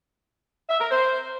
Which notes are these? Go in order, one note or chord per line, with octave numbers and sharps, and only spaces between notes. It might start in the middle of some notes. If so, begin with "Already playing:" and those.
E5
A#4
C5